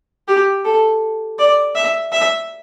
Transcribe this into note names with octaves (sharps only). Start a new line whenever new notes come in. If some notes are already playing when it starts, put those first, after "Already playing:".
G4
A4
D5
E5
E5